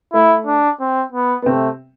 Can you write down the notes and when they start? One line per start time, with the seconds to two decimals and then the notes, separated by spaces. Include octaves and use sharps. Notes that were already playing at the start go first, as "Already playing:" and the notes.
0.13 A3 E4
0.46 D4
0.80 C4
1.12 B3
1.42 B3
1.46 C3 A3 C4